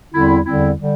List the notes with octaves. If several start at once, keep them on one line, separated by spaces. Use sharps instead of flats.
E2 D3 G3 C4 E4
E2 D3 G3 C4 E4
D3 G3